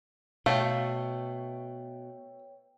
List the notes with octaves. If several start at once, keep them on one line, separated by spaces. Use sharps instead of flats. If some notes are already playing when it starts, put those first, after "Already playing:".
B2 A3 B4 C#5 F5 G5